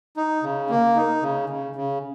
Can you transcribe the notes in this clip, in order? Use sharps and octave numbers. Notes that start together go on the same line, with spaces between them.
D#4
C#3
A#3
D#4
C#3
C#3
C#3